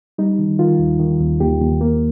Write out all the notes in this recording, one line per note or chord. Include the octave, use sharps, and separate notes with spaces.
G3 D#4
D#3
D#3 F4
D#2
D#3
D#2
D#2 G4
D#2
A#3